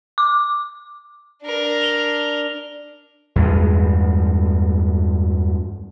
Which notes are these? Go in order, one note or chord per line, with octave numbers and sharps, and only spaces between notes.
D6
D4 A#4
F7 G7
E2 G2 G#3